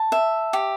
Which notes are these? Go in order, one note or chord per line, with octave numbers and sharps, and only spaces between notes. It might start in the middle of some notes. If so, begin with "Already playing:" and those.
Already playing: A5
E5
G4